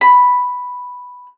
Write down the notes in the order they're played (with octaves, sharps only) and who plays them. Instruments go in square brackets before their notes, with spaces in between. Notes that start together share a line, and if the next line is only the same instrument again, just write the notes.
[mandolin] B5